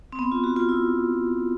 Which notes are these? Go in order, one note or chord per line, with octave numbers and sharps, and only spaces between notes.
C4
B3
F4
F#4
F4
E4